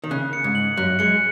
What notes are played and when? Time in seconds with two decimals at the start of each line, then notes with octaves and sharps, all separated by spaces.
0.04 D#3
0.11 C#3 F#6
0.33 C#7
0.44 G#2
0.55 F#7
0.77 F#2 F#6
0.99 G#3 C#7